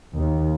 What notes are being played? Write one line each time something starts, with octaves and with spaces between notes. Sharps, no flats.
D#2